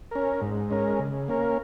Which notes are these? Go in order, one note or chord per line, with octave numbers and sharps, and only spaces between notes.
C#4 A#4
G#2
G#3 C#4 A#4
C#3
A#3 C#4 A#4